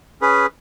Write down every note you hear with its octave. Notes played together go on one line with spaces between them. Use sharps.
C#4 G#4 B4